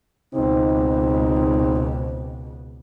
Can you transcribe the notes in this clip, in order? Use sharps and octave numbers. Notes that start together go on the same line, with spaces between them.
C#2 B2 C4 D#4